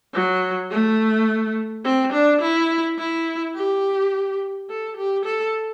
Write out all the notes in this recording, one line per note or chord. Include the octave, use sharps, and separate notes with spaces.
F#3
A3
C4
D4
E4
E4
G4
A4
G4
A4